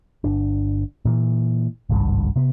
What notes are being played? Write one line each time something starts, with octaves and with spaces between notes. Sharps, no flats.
G1 D4
A#2 E3
G#1 C#2 G2
C3 B3